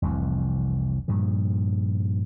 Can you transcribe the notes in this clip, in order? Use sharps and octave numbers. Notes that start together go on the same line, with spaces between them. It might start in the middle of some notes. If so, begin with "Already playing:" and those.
F1 C2 F2 E3
G2 A#2 F3